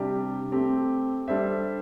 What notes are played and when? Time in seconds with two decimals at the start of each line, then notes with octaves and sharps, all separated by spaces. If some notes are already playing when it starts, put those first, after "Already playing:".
Already playing: C3 G3 D4 G4
0.52 A3 C4 G4
1.28 G3 D4 A4 C5 E5